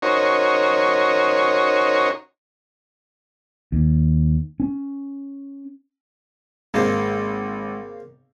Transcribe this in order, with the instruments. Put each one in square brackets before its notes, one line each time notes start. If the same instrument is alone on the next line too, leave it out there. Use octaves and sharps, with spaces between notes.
[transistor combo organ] C#4 D#4 F#4 A#4 C5 C#5
[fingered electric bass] D#2
C#4
[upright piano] G#1 [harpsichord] C#3 A#3 C5 [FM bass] G#3